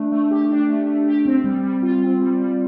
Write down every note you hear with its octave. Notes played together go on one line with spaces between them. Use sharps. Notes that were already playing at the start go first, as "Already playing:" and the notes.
Already playing: A3 D4
A3
G4
D4
A3
A3
G4
C4
G3
G3
F4
C4
G3
G3